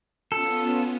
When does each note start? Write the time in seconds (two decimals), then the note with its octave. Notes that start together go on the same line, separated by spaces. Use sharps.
0.32 B3 C#4 F4 A4